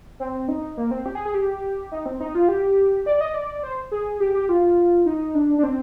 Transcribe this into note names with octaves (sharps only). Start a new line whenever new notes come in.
C4
D#4
A#3
C4
G4
G#4
G#4
G4
D#4
C4
D#4
F4
G4
D5
D#5
D5
C5
G#4
G4
G4
F4
D#4
D4
D4
C4